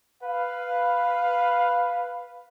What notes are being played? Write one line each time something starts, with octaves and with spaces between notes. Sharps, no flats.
B4 F5